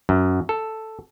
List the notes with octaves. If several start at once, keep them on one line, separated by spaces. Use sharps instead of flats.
F#2
A4